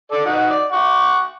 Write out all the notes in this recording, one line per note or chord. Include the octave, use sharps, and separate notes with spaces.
A4 D5
D#4 F#4 F#5
D5
F#5 C#6 D6